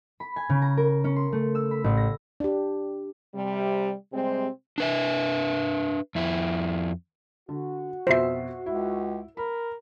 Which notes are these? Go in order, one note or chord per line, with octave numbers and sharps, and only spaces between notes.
B5
G#5
C#3
A#5
A#4
C#4
C6
A3
E6
B5
A1
A#6
D4 G4
C3 G3
C3 G3 G#3 C4
D4 B4 E5
F2 E4
D3 F#4
F2 B2 C5 E5 C7
C#2 E4
A#4 B5